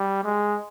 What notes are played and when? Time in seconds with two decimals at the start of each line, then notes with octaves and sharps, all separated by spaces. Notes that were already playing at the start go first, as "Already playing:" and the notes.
Already playing: G3
0.24 G#3